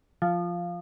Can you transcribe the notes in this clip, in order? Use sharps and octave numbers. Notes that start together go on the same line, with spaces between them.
F3